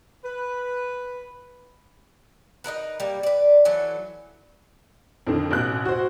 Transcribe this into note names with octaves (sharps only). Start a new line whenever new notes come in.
B4
D#4 E4 A#4 B4
G3 A#3
B4 D5
E3 F#3 A3
F2 D3 D#3
A1 B2 F#6
F#4 C5